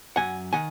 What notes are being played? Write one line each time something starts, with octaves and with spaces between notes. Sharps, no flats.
F#2 F#5 G#5
D#3 F#5 G#5